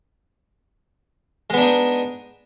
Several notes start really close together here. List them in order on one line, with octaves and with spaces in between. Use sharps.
G#3 B3 D4 D#4